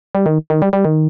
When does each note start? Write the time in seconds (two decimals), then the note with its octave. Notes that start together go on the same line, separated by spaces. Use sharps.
0.15 G3
0.26 D#3
0.50 D#3
0.62 G3
0.73 G3
0.85 D#3